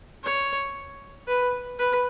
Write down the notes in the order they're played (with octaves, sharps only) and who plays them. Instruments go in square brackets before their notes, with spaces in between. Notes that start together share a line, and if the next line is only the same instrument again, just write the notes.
[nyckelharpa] C#5
B4
B4